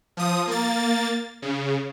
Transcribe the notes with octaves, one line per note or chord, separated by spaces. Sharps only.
F3 D#6
A#3 A6
C#3